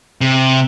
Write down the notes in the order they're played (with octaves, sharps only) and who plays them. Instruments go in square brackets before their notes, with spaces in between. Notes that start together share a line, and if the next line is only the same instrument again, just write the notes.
[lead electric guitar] C3